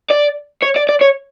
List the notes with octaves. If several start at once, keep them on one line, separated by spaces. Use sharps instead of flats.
D5
C#5
D5
D5
C#5